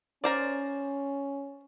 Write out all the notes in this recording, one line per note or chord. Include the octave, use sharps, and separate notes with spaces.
C#4 A#4 C5 D5